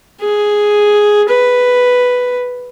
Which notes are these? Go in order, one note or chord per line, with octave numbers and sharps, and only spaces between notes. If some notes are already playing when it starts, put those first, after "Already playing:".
G#4
B4